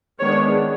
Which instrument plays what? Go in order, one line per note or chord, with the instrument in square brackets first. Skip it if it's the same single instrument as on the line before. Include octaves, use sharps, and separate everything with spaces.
[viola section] D#3 G#3 B3 D4 C#5